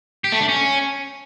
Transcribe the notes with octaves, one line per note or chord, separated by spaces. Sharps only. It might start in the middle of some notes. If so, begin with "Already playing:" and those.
G4
A3
D4
C#4